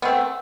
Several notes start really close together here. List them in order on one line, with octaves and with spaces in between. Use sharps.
B3 C4 A3